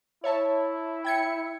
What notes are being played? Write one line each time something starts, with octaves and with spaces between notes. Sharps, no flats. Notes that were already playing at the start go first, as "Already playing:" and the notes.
E4 C#5 E5 A5
G5 G#6 C#7